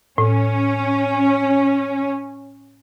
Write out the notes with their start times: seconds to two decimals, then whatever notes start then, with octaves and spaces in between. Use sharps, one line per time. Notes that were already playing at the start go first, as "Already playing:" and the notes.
0.18 A2 C#4